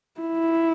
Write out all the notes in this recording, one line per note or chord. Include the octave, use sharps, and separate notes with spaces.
E4